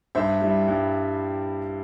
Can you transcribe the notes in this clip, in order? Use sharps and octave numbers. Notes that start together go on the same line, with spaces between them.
G2 C5 E5
G3 E4
G2